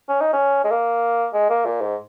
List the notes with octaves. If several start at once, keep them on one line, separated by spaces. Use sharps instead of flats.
C#4
D#4
C#4
G#3
A#3
G#3
A#3
A#2
G#2